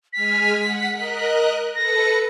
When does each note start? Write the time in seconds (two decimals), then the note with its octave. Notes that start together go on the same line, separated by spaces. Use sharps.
0.13 G#3 G#5 F6 B6
0.60 F#5
0.92 A#4 D#5 F#6
1.75 A4 B4 A#6 C#7